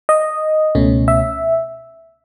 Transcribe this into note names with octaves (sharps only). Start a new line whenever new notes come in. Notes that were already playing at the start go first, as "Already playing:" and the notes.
D#5
C#2 B2 A3 C#4
E5